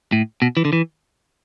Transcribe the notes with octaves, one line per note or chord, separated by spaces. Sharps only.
A2
B2
E3
D3
E3